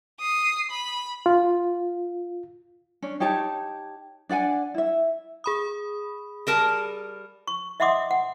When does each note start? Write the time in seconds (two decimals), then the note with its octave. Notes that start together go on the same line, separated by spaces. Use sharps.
0.20 D#6 C7
0.71 B5
1.26 F4
3.02 C#4 D4
3.20 D#4 G4 C#5 A5
4.29 D4 D5 F#5 G#5
4.74 E4 E5
5.44 G#4 B5 D#6
6.47 G3 A#4 A5
7.47 C#6
7.80 D#5 E5 F#5 C6 D6 D#6
8.11 F#5